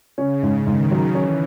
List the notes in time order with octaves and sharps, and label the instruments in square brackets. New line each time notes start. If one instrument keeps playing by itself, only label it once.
[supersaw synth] C#3 [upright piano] C#4
[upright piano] G#2
[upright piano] G#2 [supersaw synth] D#3
[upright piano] F#3
[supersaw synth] E3 [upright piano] C#4